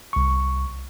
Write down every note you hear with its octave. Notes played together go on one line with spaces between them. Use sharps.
C2 C#6